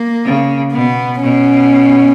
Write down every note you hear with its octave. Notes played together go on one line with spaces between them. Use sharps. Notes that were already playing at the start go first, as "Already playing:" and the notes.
Already playing: A#3
C#3
B2 B3
B2 C#4